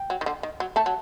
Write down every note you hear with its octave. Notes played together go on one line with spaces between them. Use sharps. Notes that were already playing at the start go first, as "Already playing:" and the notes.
Already playing: G5
F#3
D#3
D3
D#3
F#3
A3 A5
F#3